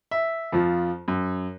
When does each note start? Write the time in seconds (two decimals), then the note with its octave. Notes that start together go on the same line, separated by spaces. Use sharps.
0.11 E5
0.53 F2 F3
1.08 F#2